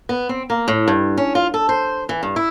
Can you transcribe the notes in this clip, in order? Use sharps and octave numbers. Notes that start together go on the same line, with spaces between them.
B3
C4
A#3
A2
G2
C#4
F4
A4
C5
E3
G2
E4